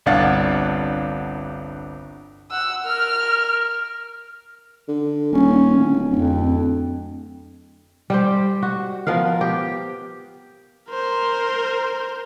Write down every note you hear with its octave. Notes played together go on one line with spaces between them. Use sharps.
G1 C2 D4 F5 F#5 A6
F#5 E6
A#4 F6
D3
D#1 C#4
D1
D1 F2
G3 G4 C5
F#4
F3 B3 A#4 F5
G4
A#4 C5